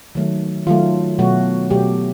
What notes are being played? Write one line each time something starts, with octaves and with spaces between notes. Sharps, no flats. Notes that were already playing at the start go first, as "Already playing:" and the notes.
D#3 F#3 A3
D#3 F#3 A3 F4
B2 F#3 A3 F#4
B2 F#3 A3 G4